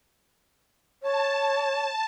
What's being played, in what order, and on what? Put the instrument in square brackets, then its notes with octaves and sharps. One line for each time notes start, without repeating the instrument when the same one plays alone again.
[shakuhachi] C#5 [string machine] A5